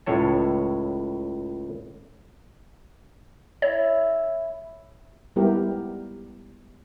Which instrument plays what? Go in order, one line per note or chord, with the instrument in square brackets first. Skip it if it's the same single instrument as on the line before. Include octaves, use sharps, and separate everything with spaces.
[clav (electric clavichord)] C#2 A2 C#5 A5
[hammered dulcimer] E4 E5 [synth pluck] C#5
[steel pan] G3 G#3 B3 E4 G4 A#4